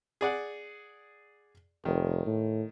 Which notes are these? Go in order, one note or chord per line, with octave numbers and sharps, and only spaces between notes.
G#4 D5 F#5
F1 D#3
A2